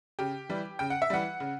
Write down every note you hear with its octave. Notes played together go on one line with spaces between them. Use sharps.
C#3 G4
E3 G3
C#3 G5
F#5
E5
E3 G3 F#5
C#3